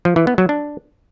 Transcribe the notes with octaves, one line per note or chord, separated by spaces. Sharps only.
F3
E3
B3
F#3
D4